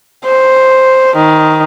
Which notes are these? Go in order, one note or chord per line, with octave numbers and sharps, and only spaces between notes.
C5
D#3